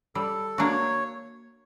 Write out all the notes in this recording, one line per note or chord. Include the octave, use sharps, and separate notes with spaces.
G3 A4
A#3 D4 F#4 C#5